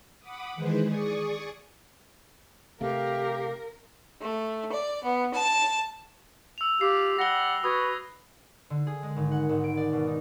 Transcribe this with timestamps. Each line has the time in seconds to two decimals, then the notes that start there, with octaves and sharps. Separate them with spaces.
0.20 F#5 B5 D6 D#6
0.55 D#3 E3 G#3 G#4 B4 C5
0.87 G#4 D5 C#6 D#6
2.81 C3 A3 G4 A#4 F5
4.22 A3
4.71 D5
5.04 B3
5.34 A5
6.58 E6 F7
6.81 F4 G4 C7
7.19 G3 F#5 A#6 G7
7.64 F#4 B4 D#6 G#6
8.70 D3
8.87 G#4
9.03 G#3
9.16 G#1
9.31 F#5
9.49 G#1
9.64 D7
9.77 D5
9.92 B2
10.07 D#4